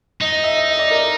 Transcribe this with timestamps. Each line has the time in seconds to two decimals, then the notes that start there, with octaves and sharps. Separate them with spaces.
0.21 D#4 D#5
0.32 D#5
0.44 E5
0.56 D#5
0.68 D#5
0.79 D5
0.91 A#4